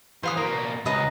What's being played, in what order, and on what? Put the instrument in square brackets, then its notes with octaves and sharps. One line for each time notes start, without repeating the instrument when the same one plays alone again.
[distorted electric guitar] E3 [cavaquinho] C5 F5 D#6
[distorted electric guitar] B2 A#3 [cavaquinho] A#5
[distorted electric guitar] C#2 [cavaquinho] B4 D#5 A#5